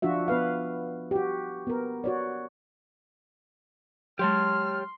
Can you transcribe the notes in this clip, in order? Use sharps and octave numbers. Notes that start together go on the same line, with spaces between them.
F3 D4 F4 F#4 E5
B3 B4 F5
F#4 G4
B3 A#4
F#4 C#5 D5
F#3 G#3 G4 C#5 A5 C6 F6